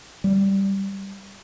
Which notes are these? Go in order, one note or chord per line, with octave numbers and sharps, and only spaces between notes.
G3